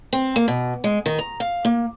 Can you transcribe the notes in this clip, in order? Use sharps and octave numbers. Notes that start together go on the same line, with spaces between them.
C4
A#3
B2
G#3
D#3
A#5
F5
A#3